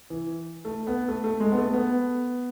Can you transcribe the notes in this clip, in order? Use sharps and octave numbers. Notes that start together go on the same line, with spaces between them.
E3
A3
B3
A3
A3
G#3
B3
A3
B3